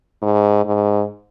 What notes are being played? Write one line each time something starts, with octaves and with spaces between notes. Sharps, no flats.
G#2
G#2